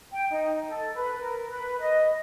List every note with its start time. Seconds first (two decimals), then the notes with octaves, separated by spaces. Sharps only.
0.12 G5
0.30 D#4
0.68 A4
0.95 B4
1.21 A#4
1.50 B4
1.80 D#5